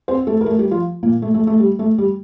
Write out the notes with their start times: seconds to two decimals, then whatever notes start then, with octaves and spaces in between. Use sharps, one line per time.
0.08 C4 C5
0.27 A3 A4
0.41 A#4
0.46 A3 A4
0.58 G3 G4
0.71 F3 F4
1.03 A#2 A#3
1.22 A3
1.34 A3
1.47 A3
1.60 G3
1.79 A3
1.98 G3